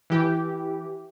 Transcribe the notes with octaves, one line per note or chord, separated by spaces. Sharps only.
E3 G4